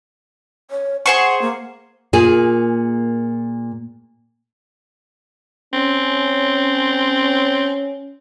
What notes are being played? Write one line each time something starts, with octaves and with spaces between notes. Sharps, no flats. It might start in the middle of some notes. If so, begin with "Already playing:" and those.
C#5
G#4 C5 F#5 C#6
A#3
A#2 A#3 G#4
C4 C#4